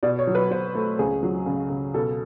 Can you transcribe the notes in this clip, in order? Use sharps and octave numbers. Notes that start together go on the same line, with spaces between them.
B2 D5
C#5
F#3
B4
B2 C5
A3
C#2 G#4
F#3
C#3
C#3
B2 A4